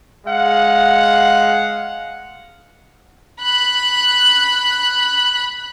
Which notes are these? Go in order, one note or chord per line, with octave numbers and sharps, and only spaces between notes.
G#3 F5 F#5
B5 F#6